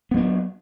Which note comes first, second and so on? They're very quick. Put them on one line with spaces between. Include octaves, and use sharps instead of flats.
B3 F#3 D4